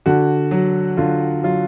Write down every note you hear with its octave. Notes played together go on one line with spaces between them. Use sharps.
D3 F#4
F#3
D3 F4
F#3 F4